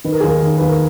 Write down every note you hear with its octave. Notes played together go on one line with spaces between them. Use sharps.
D#3 B4
A#4
G#4
D#2 A#4
D#2
D#2 B4
A#4